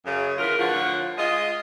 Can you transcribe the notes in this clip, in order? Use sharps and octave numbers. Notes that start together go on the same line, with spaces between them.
F#2 C#3
D3 E3 F4 F#4 A#4
A2 D3 F3 F4 C#5 F#5
G#3 F4 G#4 D#5